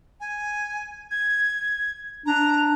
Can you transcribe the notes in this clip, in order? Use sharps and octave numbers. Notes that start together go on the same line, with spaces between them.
G#5
G#6
D4 A#5